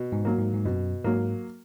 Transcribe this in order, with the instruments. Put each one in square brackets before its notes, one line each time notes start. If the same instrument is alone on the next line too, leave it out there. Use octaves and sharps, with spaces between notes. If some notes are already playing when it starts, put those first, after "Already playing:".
Already playing: [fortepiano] B2
[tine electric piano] G#2
[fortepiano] F#3 A#3
[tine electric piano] G#2
G#2
[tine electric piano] F#2 [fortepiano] B2
[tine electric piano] G#2 [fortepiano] F#3 A#3